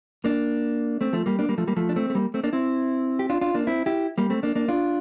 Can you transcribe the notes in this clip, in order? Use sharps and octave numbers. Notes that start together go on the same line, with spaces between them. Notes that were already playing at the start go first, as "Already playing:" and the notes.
A#3 D4
A3 C4
F3 A3
G3 A#3
A#3 D4
G3 A#3
F3 A3
G3 A#3
F3 A3
D4
A3 C4
A3
G3 A#3
A3 C4
A#3 D4
C4 E4
G4
D4 F4
D4 F4
A#3 D4
C4 E4
E4 G4
G3 A#3
A3 C4
A#3 D4
A#3 D4
D4 F4